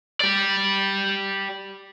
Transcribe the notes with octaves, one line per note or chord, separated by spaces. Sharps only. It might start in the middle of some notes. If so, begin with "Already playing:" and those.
G4 D5